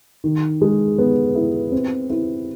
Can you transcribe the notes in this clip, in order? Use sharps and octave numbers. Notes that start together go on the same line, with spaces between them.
D#3
G#3
B3
E4
C4
E4